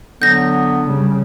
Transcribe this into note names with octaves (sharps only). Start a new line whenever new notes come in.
D3 F#3 B3 G6 A#6
C#3 G3